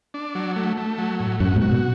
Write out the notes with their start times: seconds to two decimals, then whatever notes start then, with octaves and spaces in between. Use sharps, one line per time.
0.14 D4
0.35 F#3
0.56 A3
0.77 A3
0.98 F#3
1.20 A2
1.40 F#2 F#4
1.56 G#2 B2
1.61 F#4
1.71 B2